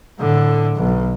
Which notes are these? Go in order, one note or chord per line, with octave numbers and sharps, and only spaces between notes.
A2 D3
B1